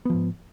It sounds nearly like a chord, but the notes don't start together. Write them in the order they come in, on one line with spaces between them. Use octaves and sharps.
B3 F3 G#2